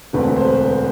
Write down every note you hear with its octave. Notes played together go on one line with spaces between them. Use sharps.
E1 D2 D3 A3 C4 B4
C5
B4